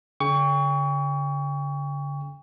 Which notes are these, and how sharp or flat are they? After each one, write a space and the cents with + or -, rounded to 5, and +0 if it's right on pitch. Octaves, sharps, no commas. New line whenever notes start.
D3 -45 G5 +35 C#6 +25